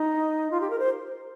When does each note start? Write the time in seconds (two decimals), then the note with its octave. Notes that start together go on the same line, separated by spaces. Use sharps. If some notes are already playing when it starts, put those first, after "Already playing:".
Already playing: D#4
0.51 F4
0.61 G4
0.70 A#4
0.79 C5